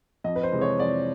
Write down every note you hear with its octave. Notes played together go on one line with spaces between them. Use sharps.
F2 D#5
B4
C5
C3 E3 G#3
C#5
F2 D5